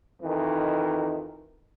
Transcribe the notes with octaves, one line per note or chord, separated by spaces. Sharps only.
F2 D#3 E3